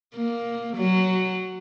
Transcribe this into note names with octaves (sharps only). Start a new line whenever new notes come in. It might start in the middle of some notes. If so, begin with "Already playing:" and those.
A#3
F#3